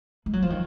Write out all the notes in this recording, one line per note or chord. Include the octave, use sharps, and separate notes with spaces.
G#3
F#3
F3
D#3